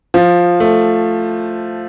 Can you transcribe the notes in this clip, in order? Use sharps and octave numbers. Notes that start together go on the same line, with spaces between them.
F3
A3